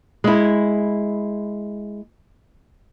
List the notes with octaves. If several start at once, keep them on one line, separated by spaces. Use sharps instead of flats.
G#3 E4